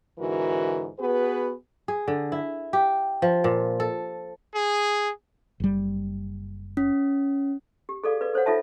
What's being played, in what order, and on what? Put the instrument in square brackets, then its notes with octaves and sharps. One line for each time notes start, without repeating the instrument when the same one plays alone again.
[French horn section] G#2 D3 E3 F#4 A#4
B3 F#4 G#4 B4
[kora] G#4
D3
E4
G4
F3
A#2
A4
[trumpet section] G#4
[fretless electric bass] F#1 G3
[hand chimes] C#4
[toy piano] G4
G#4 A4 D5 F5
B4 D5
A4 C5 C#5 F#5
D#4 F4 A4 E5 A5